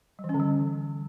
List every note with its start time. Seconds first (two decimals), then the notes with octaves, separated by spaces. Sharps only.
0.19 G3
0.24 E3
0.29 C#4
0.34 D3
0.40 G3